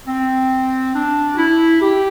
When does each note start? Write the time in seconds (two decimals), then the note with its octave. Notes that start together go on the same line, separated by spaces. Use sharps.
0.08 C4
0.95 D4
1.34 F#4
1.38 E4
1.82 G4